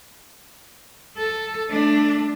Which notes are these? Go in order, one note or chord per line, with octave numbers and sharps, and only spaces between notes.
A4
A3 D4